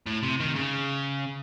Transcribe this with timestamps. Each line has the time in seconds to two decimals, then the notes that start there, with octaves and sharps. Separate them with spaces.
0.07 A2
0.23 C3
0.40 D#3
0.55 C#3